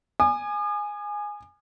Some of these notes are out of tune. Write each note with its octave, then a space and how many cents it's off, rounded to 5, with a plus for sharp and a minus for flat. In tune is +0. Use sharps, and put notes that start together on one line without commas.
G#5 +0 D#6 -45